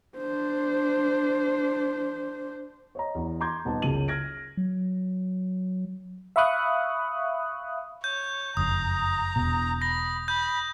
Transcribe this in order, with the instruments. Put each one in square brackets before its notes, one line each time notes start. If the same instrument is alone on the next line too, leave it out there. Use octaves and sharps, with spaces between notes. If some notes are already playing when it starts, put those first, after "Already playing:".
[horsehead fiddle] D4 C5
[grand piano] C#5 D#5 A#5
E2
A#5 C6 D6 G6 G#6
D#1 B3 D#4 A5
F#1 C#2 C#4 G#4 D#7 F#7
F6 G#6 A#6 D7
[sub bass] F#3
[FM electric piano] E5 F5 B5 C#6 D#6 F#6
[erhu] C#5 [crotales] G6
[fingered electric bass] F#1 F2 [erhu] A#5 [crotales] D#6
[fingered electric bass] E1 B2
[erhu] B5 [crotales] A#6
[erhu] B5 [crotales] G6